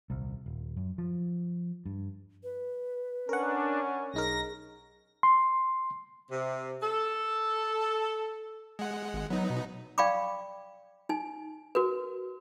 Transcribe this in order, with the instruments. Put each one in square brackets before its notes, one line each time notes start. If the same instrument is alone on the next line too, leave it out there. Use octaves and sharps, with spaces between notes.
[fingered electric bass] D#1 C2
D#1
F#2
F3
G2
[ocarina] B4
[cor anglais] C#4 [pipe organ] D4 [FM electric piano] A#4 F#5
[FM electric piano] B1 D#4 A#4 [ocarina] G#4 [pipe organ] A#6
[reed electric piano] C6
[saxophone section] C3
A4
[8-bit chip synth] G#3 F#5
[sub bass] G#1
[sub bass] F#3 [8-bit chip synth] B3 D#4
[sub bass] B2
[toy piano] D5 F5 G5 B5 C#6 D6
D#4 G#5
F#4 A#4 B4